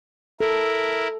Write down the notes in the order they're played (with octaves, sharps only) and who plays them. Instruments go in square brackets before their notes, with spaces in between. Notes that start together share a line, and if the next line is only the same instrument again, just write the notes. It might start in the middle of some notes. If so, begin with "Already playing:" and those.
[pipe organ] E4 A#4 [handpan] A4